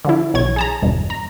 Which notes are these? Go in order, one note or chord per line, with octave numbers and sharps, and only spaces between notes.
D3 F3 E4
B1 E3 C#5 G#6
G#4 A5 A#5
G1 E2 G2 B2
A#5